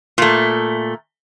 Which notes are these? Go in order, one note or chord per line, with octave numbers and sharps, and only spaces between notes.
A#2 A3